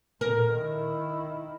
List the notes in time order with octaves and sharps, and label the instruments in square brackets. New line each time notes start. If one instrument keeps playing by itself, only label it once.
[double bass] A#2 [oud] A#4
[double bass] D#3 E4